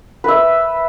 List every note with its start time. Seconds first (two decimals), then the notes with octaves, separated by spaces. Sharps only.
0.24 B4 E5